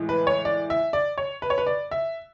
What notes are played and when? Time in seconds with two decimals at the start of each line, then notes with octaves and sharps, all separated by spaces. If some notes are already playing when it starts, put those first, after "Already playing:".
Already playing: A2 E3 G#3
0.09 B4
0.27 C#5
0.45 D5
0.70 E5
0.93 D5
1.18 C#5
1.42 B4
1.50 C#5
1.58 B4
1.66 D5
1.91 E5